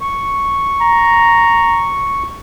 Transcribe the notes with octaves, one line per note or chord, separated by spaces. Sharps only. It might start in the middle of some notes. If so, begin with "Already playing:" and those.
C#6
A#5